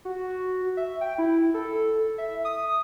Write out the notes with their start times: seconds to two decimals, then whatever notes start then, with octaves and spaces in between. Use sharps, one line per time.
0.05 F#4
0.77 E5
1.01 G5
1.18 E4
1.54 A4
2.18 E5
2.45 D#6